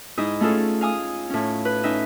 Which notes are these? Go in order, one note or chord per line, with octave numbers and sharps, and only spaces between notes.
G#2 D#4 E4 D#6
A3 C#4 F4 G#4 A4
F5 G#5 D#6
A2 C#4
B4
C#4 D#4 E5